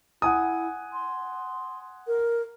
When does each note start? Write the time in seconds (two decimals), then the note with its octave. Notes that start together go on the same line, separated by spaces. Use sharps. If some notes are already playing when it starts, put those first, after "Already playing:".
0.22 E4 F#5 G#5 D#6
0.93 C6
2.07 A#4